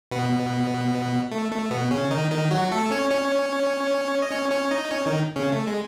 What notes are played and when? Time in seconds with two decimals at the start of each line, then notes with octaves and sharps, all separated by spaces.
0.11 B2 B3
1.31 A3
1.52 A3
1.71 B2 B3
1.91 C#3 C#4
2.11 D#3 D#4
2.31 D#3 D#4
2.51 F#3 F#4
2.72 A3 A4
2.91 C#4 C#5
3.11 C#4 C#5
4.22 D#5
4.31 C#4 C#5
4.51 C#4 C#5
4.71 D#4 D#5
4.91 C#4 C#5
5.06 D#3 D#4
5.36 C#3 C#4
5.52 A3
5.67 G#3